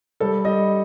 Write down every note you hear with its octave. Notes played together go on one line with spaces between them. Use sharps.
G3 A4
G3 D#5